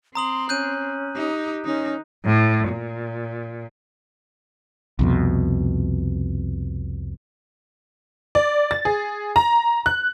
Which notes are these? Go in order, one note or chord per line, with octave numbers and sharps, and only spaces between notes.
C4 A#5 C6 D#6 F#7
C#4 F#6 G6 D#7
D#4 G4
D#3 C#4 D#4
A2
A#2
C2 F2 B2
D5
A6
G#4
A#5
F#6